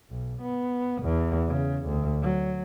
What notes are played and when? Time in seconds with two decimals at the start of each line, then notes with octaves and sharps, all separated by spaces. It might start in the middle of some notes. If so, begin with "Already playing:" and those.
0.10 B1
0.41 B3
1.02 E2
1.48 C#3
1.86 D2
2.22 F#3